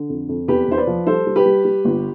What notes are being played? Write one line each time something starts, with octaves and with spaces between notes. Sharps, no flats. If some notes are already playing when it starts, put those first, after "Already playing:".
Already playing: D3
F2
F2
E2 G4 B4
E2 C5
B4 D5
F3
G3 A4 C5
G3
G4 B4
G3
G3
G1